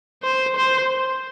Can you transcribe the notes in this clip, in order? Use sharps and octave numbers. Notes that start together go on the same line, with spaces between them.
C5
C5